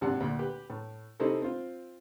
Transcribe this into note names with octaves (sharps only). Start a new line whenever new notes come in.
G#1 C3 D4 F#5
D2 A#2
G4 B4
A2
C3 A3 C4 D#4 E4 A4
C4 F4